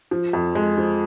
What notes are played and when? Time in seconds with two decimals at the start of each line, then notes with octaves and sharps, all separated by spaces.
0.11 F3
0.33 F2
0.55 G#3
0.77 F3